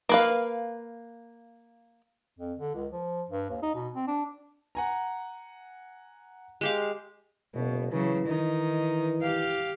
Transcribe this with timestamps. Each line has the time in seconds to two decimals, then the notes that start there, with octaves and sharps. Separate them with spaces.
0.09 A#3 B4 F5
2.39 F2
2.59 D3
2.75 C#2
2.92 F3
3.30 G2
3.50 D#2
3.62 D#4
3.75 B2
3.95 C4
4.08 D4
4.75 F#5 G#5 A#5
6.61 G#3 G4 F5
7.54 F#1 B2
7.92 C#3 E3 F#3
8.26 D#3 D#4
9.22 G4 F5